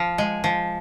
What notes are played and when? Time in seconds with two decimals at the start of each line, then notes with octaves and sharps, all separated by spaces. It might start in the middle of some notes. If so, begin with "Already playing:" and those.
Already playing: F3
0.18 G#3
0.44 F3